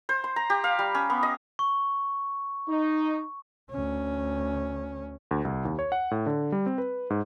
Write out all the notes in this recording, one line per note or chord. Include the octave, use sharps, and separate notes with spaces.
C5
C6
A#5
G4
F5
G3
C#4
B3
D#5
C#6
D#4
D2 C#4
D2
C2
D#2
C#5
F#5
A2
D3
G3
C4
B4
G#2